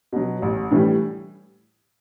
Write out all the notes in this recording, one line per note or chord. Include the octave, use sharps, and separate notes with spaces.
B2 F#3
A1
A2 E3 G3